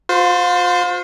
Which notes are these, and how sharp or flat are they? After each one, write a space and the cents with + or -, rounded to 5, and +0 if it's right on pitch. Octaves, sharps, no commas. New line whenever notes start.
F4 +35 C5 -20